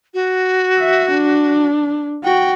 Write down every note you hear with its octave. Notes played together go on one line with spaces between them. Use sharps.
F#4
E5
D4
F#4 G5